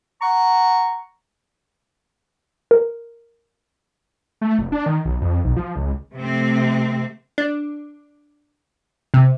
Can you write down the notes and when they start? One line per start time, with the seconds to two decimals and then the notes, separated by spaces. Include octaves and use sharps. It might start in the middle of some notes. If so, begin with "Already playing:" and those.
0.21 F#5 A#5 C#6
2.71 A#4
4.41 A3
4.59 F1
4.72 D4
4.86 D#3
5.05 B1
5.22 F2
5.44 B1
5.56 F3
5.76 C#2
6.14 C3 F3 A3 C4
7.38 D4
9.14 C3